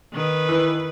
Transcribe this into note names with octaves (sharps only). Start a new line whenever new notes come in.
D#3 B4
E3